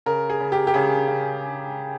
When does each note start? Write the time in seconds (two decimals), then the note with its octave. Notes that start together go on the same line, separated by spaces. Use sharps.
0.06 C#3 A#4
0.29 G#4
0.40 C#3
0.52 G4
0.67 G4
0.74 C#3 G#4
1.08 C#3